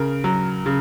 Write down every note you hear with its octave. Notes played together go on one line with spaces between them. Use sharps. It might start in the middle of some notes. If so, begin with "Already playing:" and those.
Already playing: C#3 A#4
F#3
C#3